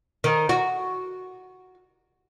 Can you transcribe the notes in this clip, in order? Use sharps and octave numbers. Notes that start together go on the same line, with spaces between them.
D#3
F#4